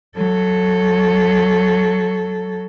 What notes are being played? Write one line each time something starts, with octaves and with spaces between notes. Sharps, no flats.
F#3 A4